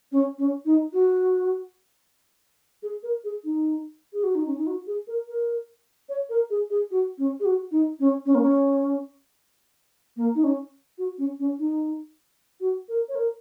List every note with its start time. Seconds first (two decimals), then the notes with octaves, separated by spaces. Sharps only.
0.12 C#4
0.38 C#4
0.65 D#4
0.93 F#4
2.83 G#4
3.03 A#4
3.24 G#4
3.44 D#4
4.13 G#4
4.23 F#4
4.35 D#4
4.46 C#4
4.57 D#4
4.67 F#4
4.87 G#4
5.07 A#4
5.28 A#4
6.09 C#5
6.29 A#4
6.50 G#4
6.70 G#4
6.91 F#4
7.18 C#4
7.40 G#4
7.45 F#4
7.71 D#4
8.00 C#4
8.26 C#4
8.35 A#3
8.42 C#4
10.16 A#3
10.35 D#4
10.44 C#4
10.98 F#4
11.18 C#4
11.39 C#4
11.59 D#4
12.60 F#4
12.88 A#4
13.09 C#5
13.15 A#4